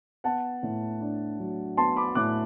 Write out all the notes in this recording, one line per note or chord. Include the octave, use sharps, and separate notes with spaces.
B3 F#5 A5
A2
D4
F#3
B3 A5 C6
B5 D6
A2 D6 F#6